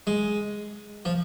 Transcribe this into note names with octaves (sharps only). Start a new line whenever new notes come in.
G#3
F3